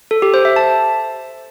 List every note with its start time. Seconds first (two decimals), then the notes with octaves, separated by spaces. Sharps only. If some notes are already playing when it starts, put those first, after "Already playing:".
0.11 A4
0.22 G4
0.34 C5
0.45 E5
0.56 A5